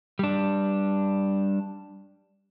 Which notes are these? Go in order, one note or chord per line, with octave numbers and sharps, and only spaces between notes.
G3 D4